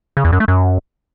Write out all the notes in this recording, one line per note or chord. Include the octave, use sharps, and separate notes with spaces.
C#3
E2
F#2
A3
F#2